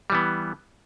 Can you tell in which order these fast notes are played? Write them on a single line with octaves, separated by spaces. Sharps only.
G3 E3 B3